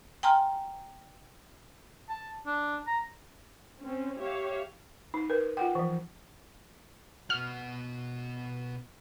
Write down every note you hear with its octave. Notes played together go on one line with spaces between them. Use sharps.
G5 G#5 A#5 C6 F6
A5
D4
A#5
C4 C#4
G4 C#5 E5 F5
D#4
A#4 B4
F4 F#5 G5
E3 F3
B2 F#4 F6